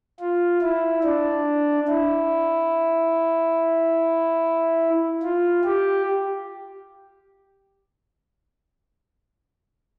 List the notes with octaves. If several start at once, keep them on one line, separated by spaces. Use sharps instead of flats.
F4
E4
D4
E4
F4
G4